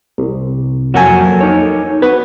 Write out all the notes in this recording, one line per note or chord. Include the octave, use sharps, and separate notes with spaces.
C2
F2 F#3 A#3 F#4 A4 G#5
D#4 C#5
B3 F#4 B4